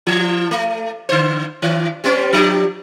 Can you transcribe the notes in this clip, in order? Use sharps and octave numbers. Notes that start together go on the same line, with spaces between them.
E3
A3
D3 C5
D#3
G3 B3 C#4
F3 D4 G4